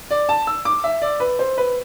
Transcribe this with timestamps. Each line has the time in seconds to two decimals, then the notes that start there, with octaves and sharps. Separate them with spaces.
0.11 D5
0.29 A5
0.47 E6
0.65 D6
0.84 E5
1.02 D5
1.20 B4
1.39 C5
1.58 B4